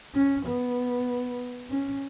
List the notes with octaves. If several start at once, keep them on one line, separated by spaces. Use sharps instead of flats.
C#4
B3
C#4